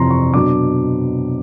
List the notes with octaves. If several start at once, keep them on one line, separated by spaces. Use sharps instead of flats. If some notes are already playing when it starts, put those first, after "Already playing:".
Already playing: F2 C3 E3 A#5 C6
C#6
B2 F#3 B3 D4 D6